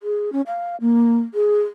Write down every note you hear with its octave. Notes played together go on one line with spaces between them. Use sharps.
G#4
C#4
F5
A#3
G#4